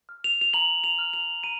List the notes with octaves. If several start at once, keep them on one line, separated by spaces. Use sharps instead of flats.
F6
F7
F7
A#5 F#7
F7
F6
F7
A#5 D#7